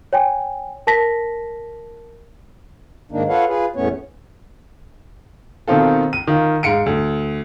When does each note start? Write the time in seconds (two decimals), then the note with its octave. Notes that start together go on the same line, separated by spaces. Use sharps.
0.13 C#5 G5 G#5
0.87 A#4 A5 A#6 B6
3.12 G#2 D#3 A#3 D4 D#4
3.29 F4 A4 B4 C#5 F5 F#5
3.48 F4 G#4 B4
3.76 E2 A2 A3 B3 C#4 C#5
5.68 B2 D#3 C4 F4 A4
6.13 D#7
6.27 D#3 F4
6.63 G#2 F5 C#7 D7
6.86 D2